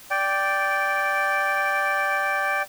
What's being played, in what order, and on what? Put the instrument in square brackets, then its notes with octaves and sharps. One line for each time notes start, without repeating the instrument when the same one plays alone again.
[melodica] D5 G5